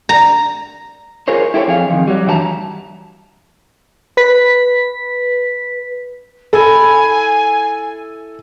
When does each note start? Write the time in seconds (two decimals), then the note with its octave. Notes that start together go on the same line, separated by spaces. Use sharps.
0.09 A#5
1.28 F4 G#4 A#4 C5 C#5
1.54 E4 G4 A4 C5 C#5
1.68 F2 G#4 F5
1.90 F2 D#3
2.07 F#3 G3
2.26 G2 E3 F#4 A5 A#5
4.17 B4 B6
6.53 E4 A4 G#5